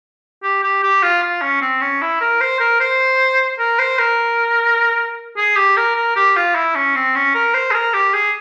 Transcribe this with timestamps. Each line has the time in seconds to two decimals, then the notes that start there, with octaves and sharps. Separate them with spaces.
0.44 G4
0.64 G4
0.83 G4
1.03 F4
1.23 F4
1.42 C#4
1.62 C4
1.81 C#4
2.02 E4
2.21 A#4
2.41 C5
2.60 A#4
2.80 C5
3.59 A#4
3.79 C5
3.99 A#4
5.37 G#4
5.56 G4
5.77 A#4
5.96 A#4
6.16 G4
6.36 F4
6.55 E4
6.76 C#4
6.95 C4
7.15 C#4
7.35 A#4
7.54 C5
7.71 G#4
7.74 A#4
7.94 G4
8.14 G#4